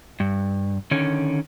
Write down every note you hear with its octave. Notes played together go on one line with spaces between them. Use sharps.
G2
D3 D#3 C#4